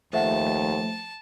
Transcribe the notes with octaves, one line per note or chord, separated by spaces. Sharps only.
D#2 F3 A3 C5 E5 F#5 A5